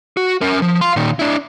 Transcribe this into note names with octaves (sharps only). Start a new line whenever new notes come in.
F#4
C#4 A#4
F3
F5 C6
A#2 D#3
D4 E4